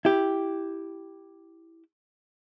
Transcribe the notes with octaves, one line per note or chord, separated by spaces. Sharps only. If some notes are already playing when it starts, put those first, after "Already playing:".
E4 G4